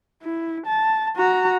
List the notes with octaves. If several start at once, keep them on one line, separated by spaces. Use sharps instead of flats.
E4
A5
F#4 A#5